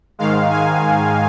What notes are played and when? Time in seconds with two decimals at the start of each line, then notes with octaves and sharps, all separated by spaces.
0.19 G#2 D#3 G#3 F5
0.50 G#5